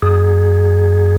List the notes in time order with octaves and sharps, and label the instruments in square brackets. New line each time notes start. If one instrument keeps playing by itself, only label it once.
[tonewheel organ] F#2 G#4